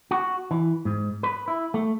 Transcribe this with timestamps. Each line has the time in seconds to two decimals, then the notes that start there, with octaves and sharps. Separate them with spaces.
0.11 F#4
0.51 E3
0.85 G#2
1.23 B4
1.48 E4
1.74 A3